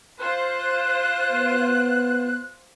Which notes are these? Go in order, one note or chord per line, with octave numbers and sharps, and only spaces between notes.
F4 C5 F#6
B3